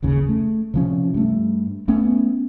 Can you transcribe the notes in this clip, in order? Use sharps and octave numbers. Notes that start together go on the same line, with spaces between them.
F#1 D#2 C#3
A3
C3 F3 C#4
G2 A3
A3 B3 C#4